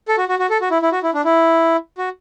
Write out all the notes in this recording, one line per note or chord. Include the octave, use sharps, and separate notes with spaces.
A4
F#4
F#4
F#4
A4
F#4
E4
E4
F#4
E4
D4
E4
F#4